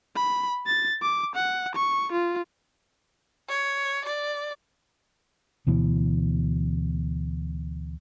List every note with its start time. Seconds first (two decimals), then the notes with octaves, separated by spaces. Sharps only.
0.16 B5
0.67 A6
1.02 D6
1.36 F#5
1.75 C#6
2.12 F4
3.49 C#5
4.05 D5
5.67 D2 B2 E3